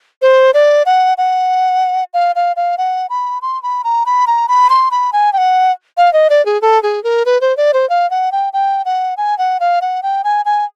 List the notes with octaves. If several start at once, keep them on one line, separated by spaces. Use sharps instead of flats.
C5
D5
F#5
F#5
F5
F5
F5
F#5
B5
C6
B5
A#5
B5
A#5
B5
C6
B5
G#5
G5
F#5
F5
D#5
D5
G#4
A4
G#4
A#4
B4
C5
D5
C5
F5
F#5
G5
G5
F#5
G#5
F#5
F5
F#5
G5
G#5
G#5